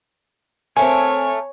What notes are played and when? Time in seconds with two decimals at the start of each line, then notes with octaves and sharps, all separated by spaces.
0.77 A3 C4 A#4 C#5 G#5